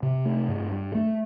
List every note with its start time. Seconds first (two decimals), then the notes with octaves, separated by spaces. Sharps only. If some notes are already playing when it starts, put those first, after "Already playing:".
0.03 C3
0.25 A3
0.48 G2
0.72 G2
0.95 A3